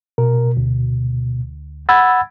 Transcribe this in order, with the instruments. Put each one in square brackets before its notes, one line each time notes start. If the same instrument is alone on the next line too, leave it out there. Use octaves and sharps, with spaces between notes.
[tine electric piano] B2 [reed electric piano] A#4
[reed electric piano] D2
[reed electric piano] F#5 G#6 [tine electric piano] B5 E6 A6